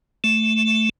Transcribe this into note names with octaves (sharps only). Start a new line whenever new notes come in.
A3